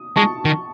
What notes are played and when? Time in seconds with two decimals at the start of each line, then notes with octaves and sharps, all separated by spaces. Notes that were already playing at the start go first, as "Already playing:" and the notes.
Already playing: D#6
0.16 G#3 A5 C#6
0.45 D#3